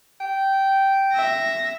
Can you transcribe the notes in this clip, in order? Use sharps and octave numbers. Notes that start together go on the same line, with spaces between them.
G5
E5 A#6